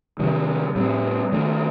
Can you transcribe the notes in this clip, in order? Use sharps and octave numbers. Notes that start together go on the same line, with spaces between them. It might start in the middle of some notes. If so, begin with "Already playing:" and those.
C3 D#3 G3
A2 G3 C4
D#3 A3 D4